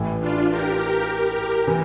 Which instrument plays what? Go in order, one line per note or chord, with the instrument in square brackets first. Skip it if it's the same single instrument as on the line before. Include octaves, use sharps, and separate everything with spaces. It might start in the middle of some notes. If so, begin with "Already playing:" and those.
Already playing: [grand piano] A1 A2 E3 A3
[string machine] D4 F4
G4 A#4
G4 A#4
G4 A#4
[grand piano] E3